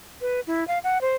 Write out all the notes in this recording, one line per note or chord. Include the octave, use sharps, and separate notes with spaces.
B4
E4
F5
F#5
C5